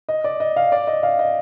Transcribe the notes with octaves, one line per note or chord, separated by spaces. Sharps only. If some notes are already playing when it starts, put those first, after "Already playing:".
D#5
D5
D#5
F5
D5
D#5
F5
D#5